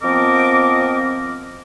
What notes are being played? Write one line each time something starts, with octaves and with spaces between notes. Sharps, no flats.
F3 B3 C4 A#4 D#5 D6